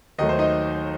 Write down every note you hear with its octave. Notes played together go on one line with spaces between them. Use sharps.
D#2 D#3 F#3 A3 D#5
C5
D#4 D#5